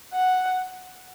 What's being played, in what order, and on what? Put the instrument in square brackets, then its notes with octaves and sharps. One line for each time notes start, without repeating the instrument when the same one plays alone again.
[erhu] F#5